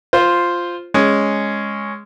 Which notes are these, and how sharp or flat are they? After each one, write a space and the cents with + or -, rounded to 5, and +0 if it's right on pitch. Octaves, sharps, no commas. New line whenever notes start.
F4 +0 C5 +0
G#3 +0 C#4 +0